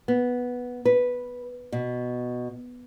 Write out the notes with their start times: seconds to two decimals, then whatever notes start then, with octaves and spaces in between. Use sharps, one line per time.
0.08 B3
0.85 B4
1.72 B2